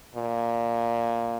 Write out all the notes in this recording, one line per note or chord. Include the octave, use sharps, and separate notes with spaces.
A#2